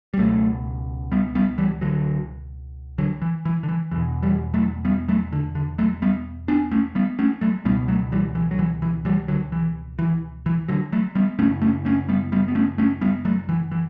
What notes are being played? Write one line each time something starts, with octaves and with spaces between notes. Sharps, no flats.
G3
C#2 B2 F#3 A3
G3 B3
G3 B3
E3 G3
D3 F#3
D3 F#3
E3
E3
D3
E3
E2 B2 E3
E3 G3
F#3 A3
G3 B3
F#3 A3
D3
D3
F#3 A3
G3 B3
B3 D4
A3 C#4
G3 B3
A3 C#4
F#3 A3
C#2 B2 G3 B3
F#3 A3
E3 G3
E3
F#3
E3
E3
E3 G3
D3 F#3
E3
E3
E3
D3 F#3
F#3 A3
G3 B3
F#2 C#3 A3 C#4
A3 C#4
A3 C#4
G3 B3
G3 B3
B3
A3 C#4
A3 C#4
G3 B3
F#3 A3
E3
E3